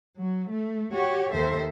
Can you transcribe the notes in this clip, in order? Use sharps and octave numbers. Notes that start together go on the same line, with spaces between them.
F#3
A3
F#4 G4 C#5
D#2 D#3 A4 C5 E5